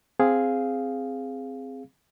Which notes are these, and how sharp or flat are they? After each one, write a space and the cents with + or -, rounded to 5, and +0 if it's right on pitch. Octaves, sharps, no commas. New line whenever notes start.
C4 +0 G#4 +0 F5 +0